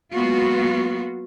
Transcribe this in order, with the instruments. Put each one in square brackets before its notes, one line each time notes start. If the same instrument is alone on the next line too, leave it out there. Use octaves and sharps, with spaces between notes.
[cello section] F#3 G#3 A#3 B3 F4 F#4